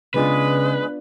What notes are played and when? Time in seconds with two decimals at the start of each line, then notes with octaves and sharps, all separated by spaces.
0.14 C#3 G#3 B3 D4 F4 B4